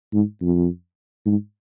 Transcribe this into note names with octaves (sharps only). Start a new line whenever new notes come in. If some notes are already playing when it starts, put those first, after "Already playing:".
G#2
F2
G#2